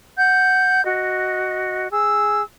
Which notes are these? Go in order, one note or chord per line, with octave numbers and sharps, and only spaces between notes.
F#5 G6
F#4 D#5
G#4 E6